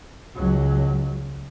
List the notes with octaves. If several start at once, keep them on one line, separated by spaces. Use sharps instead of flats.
C#2 F#3